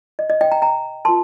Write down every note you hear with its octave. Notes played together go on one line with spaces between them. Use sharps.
D#5
D#5
D#5 G5
G5 A#5
G5 A#5
F4 A#4 A5 C6